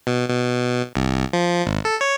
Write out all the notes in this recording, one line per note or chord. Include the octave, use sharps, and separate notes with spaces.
B2
B2
C2
F3
G#1
A4
C#5